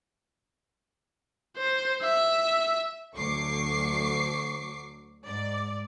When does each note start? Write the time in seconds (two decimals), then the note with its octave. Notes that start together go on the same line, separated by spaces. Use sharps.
1.58 C5
2.03 E5
3.14 D2 F#3 C#6 D6 C7
5.24 G#2 D5